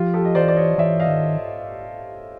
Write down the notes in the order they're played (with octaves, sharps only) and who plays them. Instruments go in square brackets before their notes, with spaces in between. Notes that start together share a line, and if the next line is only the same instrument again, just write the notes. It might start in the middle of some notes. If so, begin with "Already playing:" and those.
Already playing: [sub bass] F3 [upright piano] F4 G4
[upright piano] G4 A4
D#5
[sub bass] E3 [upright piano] C5 D5
[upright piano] D5
C#5 D#5
[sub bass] E3 [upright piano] D5 E5
[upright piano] D#5 F5
[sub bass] D#3